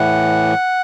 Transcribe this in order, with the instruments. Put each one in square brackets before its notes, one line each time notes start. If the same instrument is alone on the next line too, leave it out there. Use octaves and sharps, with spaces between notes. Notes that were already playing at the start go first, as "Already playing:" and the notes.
Already playing: [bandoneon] A2 E3 F#5